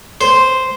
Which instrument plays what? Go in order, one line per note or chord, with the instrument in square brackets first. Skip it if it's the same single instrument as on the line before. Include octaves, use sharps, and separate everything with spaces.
[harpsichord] C5